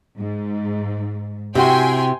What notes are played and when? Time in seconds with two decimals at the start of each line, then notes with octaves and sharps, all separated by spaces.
0.17 G#2
1.55 C3 E4 F#4 G5 G#5 C6